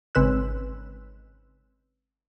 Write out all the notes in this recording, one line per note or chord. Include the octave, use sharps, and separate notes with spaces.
G#1 C#3 C4 B4 E6 F#6